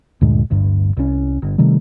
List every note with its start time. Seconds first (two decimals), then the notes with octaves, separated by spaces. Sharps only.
0.21 D2 G2 A#2 G#3
0.50 D1 G1 G2
0.97 C2 C#4
1.42 G1
1.58 C3 D#3 G3 A3